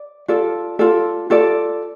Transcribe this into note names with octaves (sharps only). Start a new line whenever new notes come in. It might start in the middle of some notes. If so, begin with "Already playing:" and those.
Already playing: D5
F4 A4 D5
F4 A4 D5
F4 A4 D5